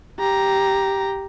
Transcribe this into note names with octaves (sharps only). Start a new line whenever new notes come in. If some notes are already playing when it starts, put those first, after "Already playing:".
G4 A#5